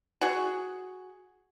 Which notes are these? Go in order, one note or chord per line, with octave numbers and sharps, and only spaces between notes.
F#4 G#4